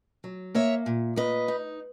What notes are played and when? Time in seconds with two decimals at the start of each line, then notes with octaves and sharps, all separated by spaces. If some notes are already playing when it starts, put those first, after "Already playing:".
0.24 F#3
0.54 A#3 C#5 E5
0.86 A#2
1.16 A#2 B4 D#5
1.48 D#4